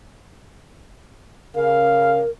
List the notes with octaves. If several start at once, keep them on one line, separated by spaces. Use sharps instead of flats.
C#3 A#4 F5